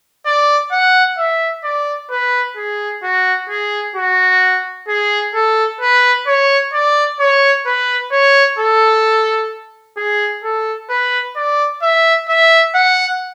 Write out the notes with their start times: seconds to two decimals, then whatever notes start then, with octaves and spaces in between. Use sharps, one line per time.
0.26 D5
0.72 F#5
1.18 E5
1.64 D5
2.11 B4
2.57 G#4
3.03 F#4
3.49 G#4
3.96 F#4
4.88 G#4
5.35 A4
5.81 B4
6.27 C#5
6.73 D5
7.20 C#5
7.66 B4
8.12 C#5
8.59 A4
9.97 G#4
10.44 A4
10.90 B4
11.36 D5
11.82 E5
12.29 E5
12.75 F#5